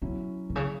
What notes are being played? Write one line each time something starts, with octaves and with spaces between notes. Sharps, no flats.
B2 F#3 C#4 E4
B2
C#3